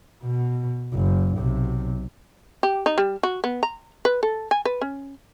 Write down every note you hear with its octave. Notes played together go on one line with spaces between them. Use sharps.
B2
F#1
B1 C3
G4
D#4
G3
F#4
B3
A#5
B4
A4
G#5
B4
C#4